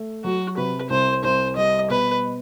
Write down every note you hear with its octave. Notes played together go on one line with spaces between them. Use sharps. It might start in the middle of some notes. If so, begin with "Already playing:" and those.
Already playing: A3
F#3 F#4
C3 B4
C2 C5
C2 C5
G3 D#5
B2 B4